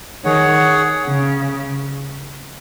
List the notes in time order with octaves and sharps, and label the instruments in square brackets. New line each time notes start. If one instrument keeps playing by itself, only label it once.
[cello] D#3 [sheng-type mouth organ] G#4 C#5 F#5
[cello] C#3